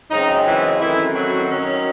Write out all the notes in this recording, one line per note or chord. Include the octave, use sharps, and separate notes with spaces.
F#2 C#3 G#3 C4 D#4
E3 E4
F#2 D#3 E3 A3 C4 E4
F#3 F#4
D#3 F#3 C#4